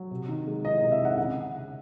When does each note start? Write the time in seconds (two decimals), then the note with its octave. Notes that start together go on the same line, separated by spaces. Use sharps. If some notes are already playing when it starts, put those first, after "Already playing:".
Already playing: F#3
0.11 C3
0.28 D#3
0.47 G#3
0.64 D#4 D#5
0.78 C3 D#5
0.91 E5
0.99 D#3
1.05 F#5
1.17 C#3 F#5